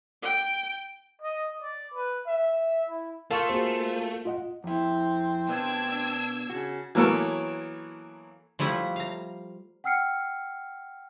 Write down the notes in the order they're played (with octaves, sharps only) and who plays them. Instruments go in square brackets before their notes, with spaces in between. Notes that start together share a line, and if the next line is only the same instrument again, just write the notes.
[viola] G5
[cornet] D#5
D5
B4
E5
E4
[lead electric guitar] A3 [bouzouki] F4 A4 [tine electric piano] A#4 F5 C#6
[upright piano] A#3 F#4 G#4 [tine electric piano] C5
[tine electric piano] F4 D#5 F#5
[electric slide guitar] F2 E4 [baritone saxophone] C4
[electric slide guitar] B2 B4 D5 [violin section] D4 E6 G#6
[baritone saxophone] C#3 [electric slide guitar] F#4
[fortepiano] E3 F#3 A#3 B3 A4 C#5
[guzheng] F3 G3 A3 E4 F#5
F5 A#5
[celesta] F#5 G5 E6 F6 C7 C#7